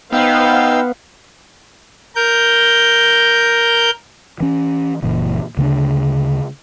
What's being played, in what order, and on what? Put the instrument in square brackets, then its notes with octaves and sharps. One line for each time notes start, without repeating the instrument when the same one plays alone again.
[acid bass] B3 [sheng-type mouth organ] D#4 G5 E6 [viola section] B4 C5 F5
[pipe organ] A#4 G6
[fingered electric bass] E3 C#4
F#1 A#2 E3
D2 C#3 A3 D4